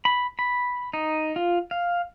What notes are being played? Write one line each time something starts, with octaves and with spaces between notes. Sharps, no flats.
B5
B5
D#4
F4
F5